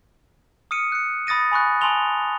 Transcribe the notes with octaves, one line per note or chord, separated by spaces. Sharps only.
D#6 F6 C#7 D#7
F#6 C#7
B5 D#6 A6 A#6 D#7
G#5 B5 C#6 F#6
G#5 A5 C6 E6 F7 G7